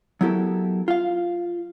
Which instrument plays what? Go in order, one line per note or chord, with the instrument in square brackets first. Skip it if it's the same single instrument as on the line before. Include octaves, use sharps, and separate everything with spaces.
[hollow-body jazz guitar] F#3 B3 E4 G4 A4 A#4
F4 F5